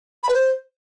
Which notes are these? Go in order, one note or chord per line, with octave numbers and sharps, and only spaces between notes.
B5
B4
C5